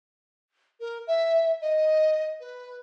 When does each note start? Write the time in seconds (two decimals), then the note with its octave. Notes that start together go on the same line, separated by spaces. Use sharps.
0.80 A#4
1.07 E5
1.61 D#5
2.40 B4